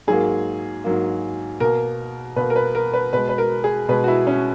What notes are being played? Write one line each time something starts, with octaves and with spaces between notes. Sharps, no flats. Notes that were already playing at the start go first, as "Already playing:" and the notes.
G#2 F#3 A#3 G#4
G#2 F#3 A#3
B2 A#3 A#4
B2 A#3 B4
A#4
B4
A#4
B4
B2 G#3 B4
B4
A#4
G#4
B2 G#3 B4
F#4
E4
C#4